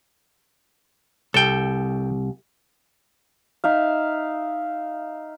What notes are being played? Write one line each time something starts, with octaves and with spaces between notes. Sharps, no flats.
C2 A4 G5
D#4 E5 F5